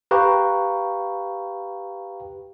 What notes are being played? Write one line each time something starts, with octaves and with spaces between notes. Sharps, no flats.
G4 B4 F5 G5 A#5 C#6